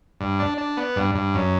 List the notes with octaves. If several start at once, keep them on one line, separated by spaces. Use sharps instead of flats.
G2
D4
D4
B3
G2
G2
F#2